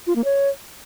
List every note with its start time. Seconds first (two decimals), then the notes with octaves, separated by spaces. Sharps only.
0.07 F4
0.16 A#3
0.24 C#5